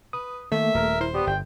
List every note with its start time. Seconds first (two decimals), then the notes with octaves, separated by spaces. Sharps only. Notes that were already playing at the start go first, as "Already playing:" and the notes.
0.13 B4 D#6
0.52 D#3 A3 A#3 E5
0.74 D#1 A#4
1.01 E4 C5
1.14 B3 G4 D5
1.27 G1 G5